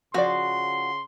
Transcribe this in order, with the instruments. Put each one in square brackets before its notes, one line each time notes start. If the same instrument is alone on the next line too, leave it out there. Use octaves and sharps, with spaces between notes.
[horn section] C#3 C6 [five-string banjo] F3 D5 [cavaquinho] F#4